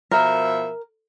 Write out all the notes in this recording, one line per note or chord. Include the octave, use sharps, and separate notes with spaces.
B2 F3 A#4 E5